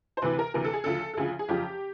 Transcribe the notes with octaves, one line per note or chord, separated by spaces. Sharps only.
C5
D2 C3 E3 B4
A#4
D2 C3 E3 A#4
A4
G#4
D2 C#3 F3 A4
A4
D2 C#3 F3 G#4
G#4
F#1 F2 C#3 F3 G4